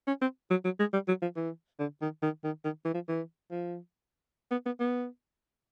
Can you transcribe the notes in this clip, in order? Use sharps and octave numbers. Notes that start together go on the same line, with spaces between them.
C#4
C4
F#3
F#3
G#3
G3
F#3
F3
E3
D3
D#3
D#3
D#3
D#3
E3
F3
E3
F3
B3
B3
B3